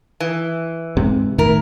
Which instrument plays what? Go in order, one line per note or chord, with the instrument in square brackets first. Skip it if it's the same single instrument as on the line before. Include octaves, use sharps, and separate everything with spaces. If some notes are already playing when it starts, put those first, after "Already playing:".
[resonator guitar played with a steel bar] E3
[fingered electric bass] G#2 C3
[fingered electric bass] A2 D#3 [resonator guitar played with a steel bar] E4 A#4